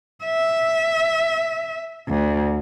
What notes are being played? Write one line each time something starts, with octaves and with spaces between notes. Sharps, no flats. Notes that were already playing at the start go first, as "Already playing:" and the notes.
E5
D2